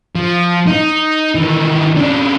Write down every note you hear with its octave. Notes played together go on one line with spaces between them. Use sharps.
F3
D#4
D#3 E3
C#3 D4